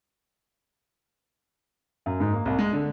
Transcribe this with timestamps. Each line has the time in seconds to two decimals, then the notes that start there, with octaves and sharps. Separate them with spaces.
2.06 F#2
2.20 G#2
2.33 A#3
2.45 C2
2.59 G#3
2.73 D3